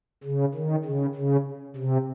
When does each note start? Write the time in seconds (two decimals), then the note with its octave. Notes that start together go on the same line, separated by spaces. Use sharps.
0.24 C#3
0.54 D#3
0.85 C#3
1.15 C#3
1.76 C3